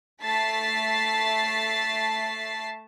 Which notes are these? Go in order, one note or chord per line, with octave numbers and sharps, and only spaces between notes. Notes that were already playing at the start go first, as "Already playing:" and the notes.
A3 A5 A6 B6 C7